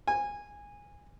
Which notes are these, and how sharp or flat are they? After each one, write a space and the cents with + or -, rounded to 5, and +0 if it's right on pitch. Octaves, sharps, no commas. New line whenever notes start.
G#5 -15